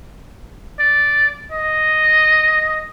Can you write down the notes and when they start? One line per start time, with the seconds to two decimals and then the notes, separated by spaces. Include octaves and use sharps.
0.80 D5
1.52 D#5